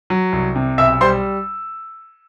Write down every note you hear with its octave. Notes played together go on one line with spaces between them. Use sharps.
F#3
C2
C3
B1 E5 E6
G3 C5 C6